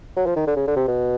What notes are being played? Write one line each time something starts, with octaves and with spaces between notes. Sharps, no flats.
F#3
F3
D#3
D3
C#3
D3
C3
B2